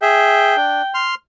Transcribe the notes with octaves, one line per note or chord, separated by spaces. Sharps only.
G#4 E5 G5
D4
C6 F6